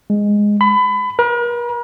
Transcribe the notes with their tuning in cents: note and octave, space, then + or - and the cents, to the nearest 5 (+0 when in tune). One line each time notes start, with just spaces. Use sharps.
G#3 -5
B5 +25
A#4 +45